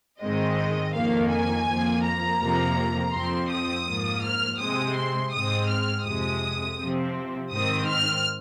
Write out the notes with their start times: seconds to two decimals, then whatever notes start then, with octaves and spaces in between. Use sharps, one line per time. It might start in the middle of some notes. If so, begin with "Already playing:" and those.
0.21 G#2 D#3 G#3 C4 D#5
0.94 F2 D#3 A#3 F5
1.30 G#5
1.67 F2 F3 A#3
2.04 A#5
2.40 F2 C3 F3 A#3
3.13 F2 F3 C4 C6
3.49 D#6
3.86 G#2 F3 A#3
4.22 F6
4.58 C3 G#3 C4 D#6
4.95 C6
5.32 G#2 G#3 C4 D#6
5.68 F6
6.05 F2 C3 G#3 D#6
6.78 C3 F3 C4
7.51 G#2 D#3 C4 D#6
7.87 F6